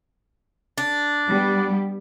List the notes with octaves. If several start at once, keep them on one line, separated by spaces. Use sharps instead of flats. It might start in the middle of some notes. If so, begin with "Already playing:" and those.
D4
G3 B3 G4